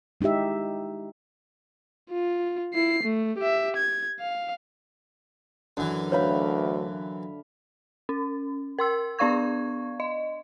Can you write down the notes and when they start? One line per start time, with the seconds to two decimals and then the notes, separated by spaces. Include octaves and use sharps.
0.21 G#3 D#4 E4 G4 E5
2.10 F4
2.74 E4 C7
3.03 A3
3.38 G4 E5
3.77 G#6
4.20 F5
5.77 F#2 D3 E3
6.12 D2 B4 C#5 E5 F5 B5
8.09 C#4
8.79 A#4 C6 E6
9.19 B3 D4 D5 F5 C#6 G#6
10.00 D#5